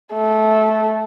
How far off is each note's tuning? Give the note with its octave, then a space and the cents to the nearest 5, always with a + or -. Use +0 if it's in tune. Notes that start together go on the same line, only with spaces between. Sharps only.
A3 -15